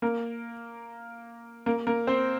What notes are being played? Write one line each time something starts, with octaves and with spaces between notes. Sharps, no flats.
A#3 A#4
A#3 A#4
A#3 A#4
C4 C5